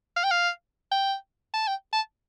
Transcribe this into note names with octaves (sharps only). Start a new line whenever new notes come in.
F5
G5
F5
G5
A5
G5
A5